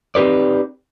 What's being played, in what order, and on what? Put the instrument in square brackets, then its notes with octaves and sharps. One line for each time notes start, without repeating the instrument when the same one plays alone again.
[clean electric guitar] C4 D#4 G4 B4 D5